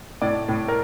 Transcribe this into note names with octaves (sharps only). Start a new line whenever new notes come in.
A2 D5
A2
A#4